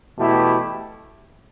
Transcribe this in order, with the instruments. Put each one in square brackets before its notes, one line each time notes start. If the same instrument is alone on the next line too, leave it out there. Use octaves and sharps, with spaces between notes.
[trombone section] E2 B2 A3 E4 G4